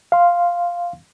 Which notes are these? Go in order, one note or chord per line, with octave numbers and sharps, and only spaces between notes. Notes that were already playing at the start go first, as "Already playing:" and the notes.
F5 C6